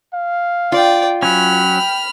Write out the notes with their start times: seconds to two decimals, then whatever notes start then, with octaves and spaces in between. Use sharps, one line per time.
0.14 F5
0.72 F4 D5 G5
1.23 F#3 C#4 G5 B5 F6